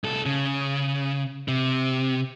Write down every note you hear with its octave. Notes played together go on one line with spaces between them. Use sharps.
C2 A4
C#3
C3